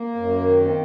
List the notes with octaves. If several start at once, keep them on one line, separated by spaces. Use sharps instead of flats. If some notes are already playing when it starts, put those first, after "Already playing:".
Already playing: A#3
F#2
D#3
C4